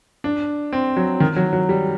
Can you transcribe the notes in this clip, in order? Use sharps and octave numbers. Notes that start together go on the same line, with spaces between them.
D4
C4
F#3
D#3
F#3
F#3
G3